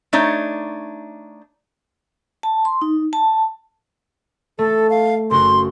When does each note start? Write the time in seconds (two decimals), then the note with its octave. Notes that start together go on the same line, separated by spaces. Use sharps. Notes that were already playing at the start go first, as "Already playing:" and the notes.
0.13 A3 D4 D#4 C#5
2.43 A5
2.65 C6
2.82 D#4
3.13 A5
4.59 A3 A4
4.90 F5
5.31 F#1 F#4 C6